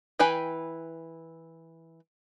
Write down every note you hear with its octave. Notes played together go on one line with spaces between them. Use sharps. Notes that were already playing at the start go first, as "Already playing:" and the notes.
E3 B4 G5 G#5 B5